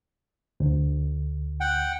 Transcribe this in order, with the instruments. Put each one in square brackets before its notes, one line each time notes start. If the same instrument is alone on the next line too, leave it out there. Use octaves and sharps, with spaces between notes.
[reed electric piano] D2
[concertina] F#5 G5